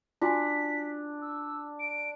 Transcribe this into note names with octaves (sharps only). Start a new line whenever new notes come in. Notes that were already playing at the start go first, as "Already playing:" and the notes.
D4 F4 F#4 G#5 B6
E6
D7